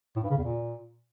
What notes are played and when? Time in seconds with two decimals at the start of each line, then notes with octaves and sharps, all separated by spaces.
0.16 A2
0.23 G2
0.30 C#3
0.37 E2
0.44 A#2